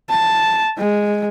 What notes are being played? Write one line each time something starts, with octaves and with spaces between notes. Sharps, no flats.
A5
G#3